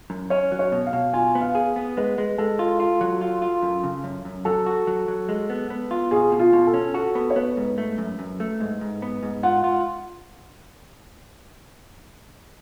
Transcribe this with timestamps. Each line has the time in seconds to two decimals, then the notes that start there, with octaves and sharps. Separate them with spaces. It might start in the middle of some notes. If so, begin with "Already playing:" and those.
0.10 F#2
0.30 C#4 C#5
0.52 F#3
0.59 C#5
0.72 B2
0.87 F5
0.93 B2
1.13 F4 G#5
1.35 B3
1.41 F5
1.55 G#4
1.76 B3
1.97 G#3 B4
2.18 G#3
2.38 G#3 A4
2.59 F4
2.80 F4
3.01 F#3
3.21 F4
3.42 F4
3.62 F#2
3.84 C#3
4.04 F#2
4.25 F#2
4.45 F#3 A4
4.66 F#4
4.87 F#3
5.08 F#3
5.29 G#3
5.50 B3
5.70 B3
5.91 F4
6.11 B2 G#4
6.32 B2
6.39 F4
6.53 B2
6.67 A4
6.74 C#4
6.94 F#4 A4
7.15 B3
7.30 C#5
7.36 B3 B4
7.57 G#2
7.78 A3
7.98 F#2
8.19 F#2
8.40 A3
8.60 G#2
8.81 G#2
9.02 B3
9.23 G#2
9.43 F4 F#5
9.64 F4